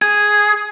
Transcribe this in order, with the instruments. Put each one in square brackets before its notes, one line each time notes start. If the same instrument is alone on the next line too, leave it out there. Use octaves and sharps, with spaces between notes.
[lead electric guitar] G#4